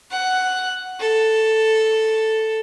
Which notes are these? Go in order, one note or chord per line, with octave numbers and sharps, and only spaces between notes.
F#5
A4